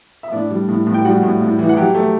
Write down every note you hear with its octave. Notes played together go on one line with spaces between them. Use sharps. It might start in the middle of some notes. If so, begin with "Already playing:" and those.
E5
A2 D4 D5
G3
A2
A2
G5
G3 F#4 F#5
A2
A2
E3
F#5
F#3 G4 G5
A3